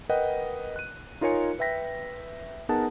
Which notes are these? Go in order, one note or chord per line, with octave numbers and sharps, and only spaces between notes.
A#4 B4 D#5 F#5 G5
F#6 D#7
D#4 F4 A#4 C#5 G#5 C#7
B4 E5 G5 A#6 B6
B3 D#4 G#4 A#4 F#5 A5